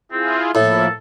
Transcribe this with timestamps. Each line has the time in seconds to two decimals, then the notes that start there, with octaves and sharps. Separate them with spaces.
0.12 C4 E4 F4 G#4
0.55 A2 F3 A#3 E4 A4